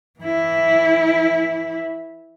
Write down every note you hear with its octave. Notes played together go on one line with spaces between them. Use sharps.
E3 E4